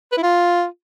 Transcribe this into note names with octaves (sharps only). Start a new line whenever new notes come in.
B4
E4
F4